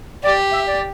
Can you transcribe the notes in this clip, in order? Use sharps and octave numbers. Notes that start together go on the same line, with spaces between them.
G4 D5
E5
D5